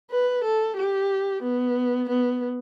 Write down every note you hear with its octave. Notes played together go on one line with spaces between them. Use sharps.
B4
A4
G4
B3
B3